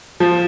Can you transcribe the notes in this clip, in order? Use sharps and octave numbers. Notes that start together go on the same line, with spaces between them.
F3